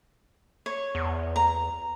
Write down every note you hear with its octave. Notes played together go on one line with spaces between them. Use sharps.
C#5
E2
A#5